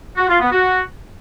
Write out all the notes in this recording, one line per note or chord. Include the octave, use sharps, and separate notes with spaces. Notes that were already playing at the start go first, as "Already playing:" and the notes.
F#4
F4
B3
F#4